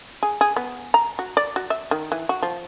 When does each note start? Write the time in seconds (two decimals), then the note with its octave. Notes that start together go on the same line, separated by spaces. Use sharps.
0.23 G#4
0.41 G#4
0.56 B3
0.94 A#5
1.19 F#4
1.37 D5
1.56 F#4
1.70 E5
1.91 D#3
2.12 E3
2.29 F#4
2.42 F3